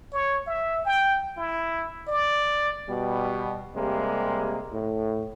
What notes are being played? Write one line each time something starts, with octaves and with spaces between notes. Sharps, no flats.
C#5
E5
G5
E4
D5
B2 G3
C3 G3 G#3 A#3
A2